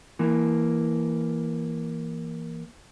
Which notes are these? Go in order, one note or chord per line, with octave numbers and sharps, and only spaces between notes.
E3 A#3